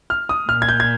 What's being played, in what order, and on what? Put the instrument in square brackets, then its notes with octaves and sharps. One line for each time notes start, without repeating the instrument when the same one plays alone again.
[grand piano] F6
D#6
[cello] A#2 [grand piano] F6
[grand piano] G#6
G6
G#6